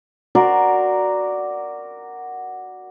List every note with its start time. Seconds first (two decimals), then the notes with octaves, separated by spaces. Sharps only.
0.35 F#4 A#4 D5 C6